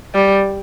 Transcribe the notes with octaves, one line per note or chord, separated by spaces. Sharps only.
G3